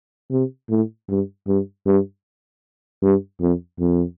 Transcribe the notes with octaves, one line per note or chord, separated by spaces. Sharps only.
C3
A2
G2
G2
G2
G2
F2
F2